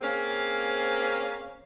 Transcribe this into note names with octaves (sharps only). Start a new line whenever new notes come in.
A#3 C4 C#4 G#4 F5